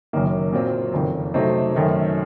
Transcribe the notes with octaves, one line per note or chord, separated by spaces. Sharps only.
F#1 F#2 D#3 A#3
A#2 F#3 C4 F4
F#1 F2 D#3
C3 F#3 A3 C4 D#4
F#2 D#3 A3